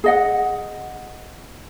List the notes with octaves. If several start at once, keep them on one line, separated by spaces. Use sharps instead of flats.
G#4 D#5 F#5